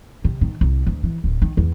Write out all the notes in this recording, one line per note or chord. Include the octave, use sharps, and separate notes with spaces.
C3
D#3
C2
D2
E3
D1
D#3
E2